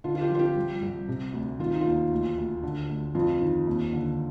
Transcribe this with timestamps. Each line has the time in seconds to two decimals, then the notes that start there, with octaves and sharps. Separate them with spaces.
0.04 D3 F4
0.15 F4
0.21 G4
0.30 F3 F4
0.39 G4
0.56 C2
0.82 C2
1.08 C3
1.33 D2
1.59 D#3 F4
1.70 D#4
1.81 D#2 F4
2.11 D2
2.37 D2
2.63 D3
2.89 D2
3.15 F2 F4
3.41 D#3
3.67 D#2
3.93 D3